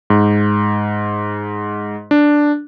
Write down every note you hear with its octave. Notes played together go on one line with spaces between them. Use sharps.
G#2
D4